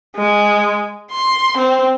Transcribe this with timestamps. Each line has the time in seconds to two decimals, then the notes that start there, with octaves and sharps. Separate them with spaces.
0.16 G#3
1.11 C6
1.57 C4